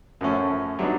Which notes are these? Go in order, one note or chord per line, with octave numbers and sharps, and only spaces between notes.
F#2 F3 A3 C#4
F#3 G3 B3 D4 D#4